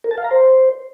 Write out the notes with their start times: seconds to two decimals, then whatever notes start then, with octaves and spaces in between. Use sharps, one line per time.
0.04 A#4
0.11 A5
0.18 F5
0.24 A#5
0.31 C5